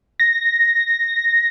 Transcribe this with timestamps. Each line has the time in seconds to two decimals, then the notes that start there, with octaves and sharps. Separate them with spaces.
0.20 A#6